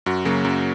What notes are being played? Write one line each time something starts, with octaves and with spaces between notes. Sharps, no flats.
F#2 F#4
C#3 F#3 A#3
F#2